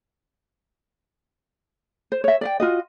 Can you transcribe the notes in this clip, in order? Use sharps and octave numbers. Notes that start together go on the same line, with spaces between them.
C5
C#5 E5
D5 E5 G5
F4 F#4 D#5